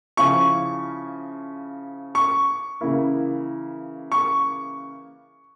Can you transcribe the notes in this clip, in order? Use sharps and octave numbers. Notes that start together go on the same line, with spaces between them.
C#3 F3 C#4 E4 C#6
C#6
C#3 E3 A#3 E4
C#6